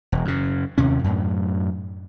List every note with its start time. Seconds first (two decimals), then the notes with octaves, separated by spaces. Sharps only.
0.12 E1
0.25 F#2 C#3
0.78 D#2 C3 C#4
1.04 F#2 A2